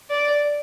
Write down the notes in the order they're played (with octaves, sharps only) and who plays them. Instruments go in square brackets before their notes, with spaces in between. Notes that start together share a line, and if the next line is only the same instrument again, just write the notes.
[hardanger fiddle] D5